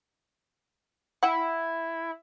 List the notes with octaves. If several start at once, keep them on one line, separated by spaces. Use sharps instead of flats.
E4 F#5 G5